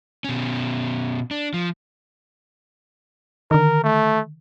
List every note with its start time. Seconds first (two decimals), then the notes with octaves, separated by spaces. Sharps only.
0.24 B2 C#4
1.31 D4
1.54 F3
3.51 D3 D#3 A#4
3.84 A3